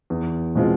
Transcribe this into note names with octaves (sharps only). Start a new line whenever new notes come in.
E2
B2 G#3 C4 F4